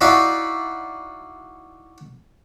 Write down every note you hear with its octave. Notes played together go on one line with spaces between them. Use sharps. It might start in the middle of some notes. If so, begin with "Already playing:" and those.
D#4 E4 F#4 D5 E5 F5